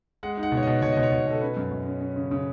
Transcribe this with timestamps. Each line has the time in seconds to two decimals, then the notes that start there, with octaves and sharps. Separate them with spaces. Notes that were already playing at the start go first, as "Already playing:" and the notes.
0.23 G#3 F#5
0.37 D#4
0.43 F#5
0.52 B2
0.57 C#5
0.63 D#5
0.67 B2
0.82 B2 C#5
0.92 B2 D#5
1.03 C#5
1.12 B2
1.27 B2 A4
1.42 C#4 B4
1.57 F#2
1.71 F#2
1.86 C#4
2.01 C#4
2.16 C#3
2.31 C#3